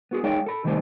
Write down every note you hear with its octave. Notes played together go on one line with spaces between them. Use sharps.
B3 F#4 G#4
G#3 D#4 G#4 C#5 F5 G5
A4 B5
C3 D#3 G3 A3 D#4 C5